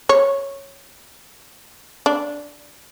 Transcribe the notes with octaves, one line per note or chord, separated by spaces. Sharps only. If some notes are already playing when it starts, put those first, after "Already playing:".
C#5
D4